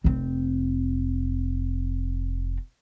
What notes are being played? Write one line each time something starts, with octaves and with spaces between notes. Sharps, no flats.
F1 C4